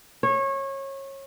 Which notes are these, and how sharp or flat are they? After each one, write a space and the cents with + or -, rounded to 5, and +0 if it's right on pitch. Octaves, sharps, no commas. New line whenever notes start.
C#5 -25